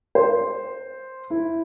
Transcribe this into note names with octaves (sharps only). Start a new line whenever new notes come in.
C5
E4